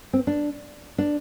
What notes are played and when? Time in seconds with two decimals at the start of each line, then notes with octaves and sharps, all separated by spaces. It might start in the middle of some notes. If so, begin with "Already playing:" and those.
0.13 C4
0.27 D4
0.98 D4